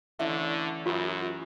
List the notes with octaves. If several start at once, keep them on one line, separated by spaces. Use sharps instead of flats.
D3 E3 A3 C#4 E5
F#2 F4 G4